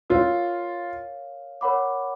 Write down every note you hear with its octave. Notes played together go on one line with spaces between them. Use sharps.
F4 A#4 C#5 F5
A#4 C#5 F#5 B5 D6